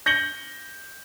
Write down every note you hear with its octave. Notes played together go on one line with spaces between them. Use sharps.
G6 A#6 C#7 F#7 G7